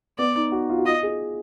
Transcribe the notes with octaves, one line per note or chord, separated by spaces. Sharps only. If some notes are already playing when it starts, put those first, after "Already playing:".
B3 D5
D#4
F#4
F4
F#4
F4 D#5
G#4